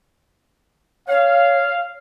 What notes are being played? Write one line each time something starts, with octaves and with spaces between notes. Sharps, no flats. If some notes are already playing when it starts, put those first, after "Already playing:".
C#5 F5